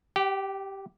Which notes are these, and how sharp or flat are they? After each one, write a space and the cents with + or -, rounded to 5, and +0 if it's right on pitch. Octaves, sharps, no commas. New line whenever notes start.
G4 -5 G5 -45